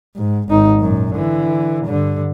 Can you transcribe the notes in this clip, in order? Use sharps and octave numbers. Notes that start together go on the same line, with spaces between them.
G#2
G#1 D#4
F#2 A#2
D3 E3
G2 D3